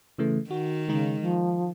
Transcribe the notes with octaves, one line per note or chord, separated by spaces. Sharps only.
C#3 E3 A3
D#3 F#4
C#3 G#3 D#4
F3